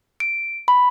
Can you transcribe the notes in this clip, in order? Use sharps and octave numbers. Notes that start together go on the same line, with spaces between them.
D7
B5